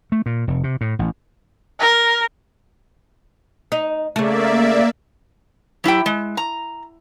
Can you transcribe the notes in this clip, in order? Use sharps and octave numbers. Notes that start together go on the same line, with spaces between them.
A3
A#2
F1
C3
A2
A1
A#4
D#4
C#3 A3 A#3 D5 E5
F#3 E4 G4 G5
G#3
A#5